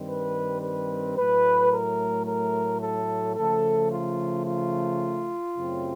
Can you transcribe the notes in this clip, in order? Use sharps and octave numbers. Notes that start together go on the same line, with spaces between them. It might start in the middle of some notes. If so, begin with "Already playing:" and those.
Already playing: G2 D#3 G3 C4
B4
B4
A2 F#3 A3 B4
A#4
A#4
A4
C#3 F3 A3 A4
F4
F4
F#2 C#3 F#3 A3 C4